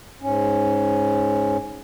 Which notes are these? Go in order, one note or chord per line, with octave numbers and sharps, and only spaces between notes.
G#2 C#4